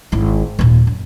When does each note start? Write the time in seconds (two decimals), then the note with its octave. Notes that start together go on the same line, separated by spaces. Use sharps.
0.12 G#1 E4
0.59 D#2 A#2
0.87 F#2